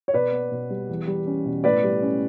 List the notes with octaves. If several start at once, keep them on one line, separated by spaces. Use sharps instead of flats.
C#5
B2 B4 D5
B3
B2
G3
E2
G3
C#4
B2
A2 B4 D5
G3
C#4